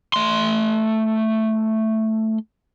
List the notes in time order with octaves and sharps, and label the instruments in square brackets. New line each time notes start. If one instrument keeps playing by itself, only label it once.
[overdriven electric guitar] A3 C6